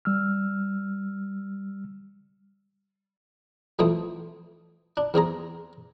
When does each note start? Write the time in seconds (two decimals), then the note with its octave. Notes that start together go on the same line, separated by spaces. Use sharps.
0.05 G3 E6 F6
3.79 F2 E3 F3 A3 C4 D#6
4.97 D4
5.14 E2 C4 G#4 A#5